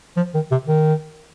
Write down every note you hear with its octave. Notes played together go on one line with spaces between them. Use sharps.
F3
D#3
C3
D#3